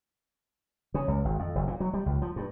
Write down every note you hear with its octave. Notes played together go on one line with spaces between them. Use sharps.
C#3
C#2
G#1
F2
F#1
A#2
F#3
G3
C#2
F3
G2